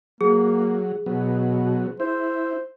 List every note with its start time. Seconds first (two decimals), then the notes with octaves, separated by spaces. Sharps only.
0.21 F#3 A#3 G#4
1.06 B2 F#3 B3
2.00 E4 C5